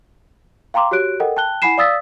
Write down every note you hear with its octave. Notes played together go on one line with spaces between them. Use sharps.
F5 G5 A#5 C6 D6
F#4 G4 C#5 F#6 D7
A4 A#4 D#5 F#5 G5
G5 A5 F#6 G7
E4 F#5 G#5 B5 C7 E7
D5 F5 D#6 E6 A6 B6